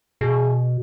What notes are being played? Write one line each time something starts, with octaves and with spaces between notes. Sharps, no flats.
B2 G#4